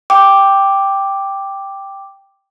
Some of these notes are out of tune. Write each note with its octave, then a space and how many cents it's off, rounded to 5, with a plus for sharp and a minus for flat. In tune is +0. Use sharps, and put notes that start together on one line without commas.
G5 +0 D6 +0